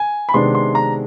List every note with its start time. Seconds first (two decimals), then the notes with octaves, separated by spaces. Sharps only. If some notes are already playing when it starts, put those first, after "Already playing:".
Already playing: G#5
0.29 B5
0.34 C3 D#3 G#3 B3 D4 C6
0.55 C6
0.75 A#5